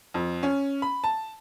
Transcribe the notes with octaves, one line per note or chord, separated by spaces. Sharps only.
F2
C#4
B5
A5